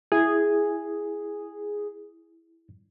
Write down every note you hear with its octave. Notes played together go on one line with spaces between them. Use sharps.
E4 G#4 G#6